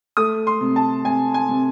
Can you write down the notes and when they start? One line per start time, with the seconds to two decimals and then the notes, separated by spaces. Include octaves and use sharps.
0.17 A3 D#6
0.47 C6
0.61 C3
0.76 A5
1.05 C3 G#5
1.34 G#5
1.49 C3